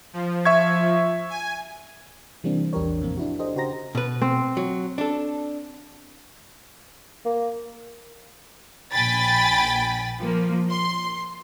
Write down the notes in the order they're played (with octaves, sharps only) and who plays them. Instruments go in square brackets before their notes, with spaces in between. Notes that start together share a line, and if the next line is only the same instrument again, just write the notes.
[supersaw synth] F3
[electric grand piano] E5 C#6 G#6
[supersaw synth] G#5
[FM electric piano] C3 E3 G3 A#3 C4 D4
A#1 E2 D4 G4 A#4 C#5
F2 A2 C3 A#3 C4
D4 E4 F#4
D4 G4 A4 C5 D#5
C#3 F#4 G4 C5 A#5 A#6
[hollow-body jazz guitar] B2 B4
[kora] C4
[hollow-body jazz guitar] F#3
D4 A4
[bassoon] A#3
[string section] A#1 G5 G#5 B5 A6 B6
F3 A#3
C6